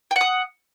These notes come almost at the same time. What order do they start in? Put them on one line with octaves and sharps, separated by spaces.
G5 F#5 D#6